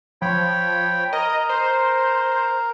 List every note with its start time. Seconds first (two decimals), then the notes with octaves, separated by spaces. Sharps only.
0.22 F3 C#5 G5 B5
1.13 A#4 D#5
1.49 C5